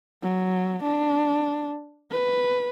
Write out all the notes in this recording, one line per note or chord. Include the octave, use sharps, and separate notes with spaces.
F#3
D4
B4